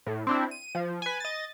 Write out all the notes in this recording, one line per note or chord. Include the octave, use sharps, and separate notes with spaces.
A2
C4 D4 E4
D#7
F3
B4 G#5
D#5 A6